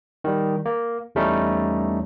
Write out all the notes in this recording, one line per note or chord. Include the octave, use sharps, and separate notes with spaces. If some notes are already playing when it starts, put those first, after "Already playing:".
D#3 G3
A#3
E2 G3 A3 C#4 D#4